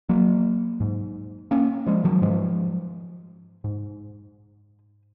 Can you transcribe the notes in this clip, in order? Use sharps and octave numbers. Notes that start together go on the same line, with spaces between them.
F#3 A#3
G#2
A#3 C#4
F3 G#3
D#3 F#3
G#2 F3 G#3
G#2